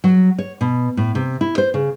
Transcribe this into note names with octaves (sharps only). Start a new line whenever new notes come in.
F#3
C#5
B2
A2
C3
E4
C5
C#3